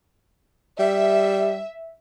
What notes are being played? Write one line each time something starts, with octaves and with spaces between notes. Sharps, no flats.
G3 E5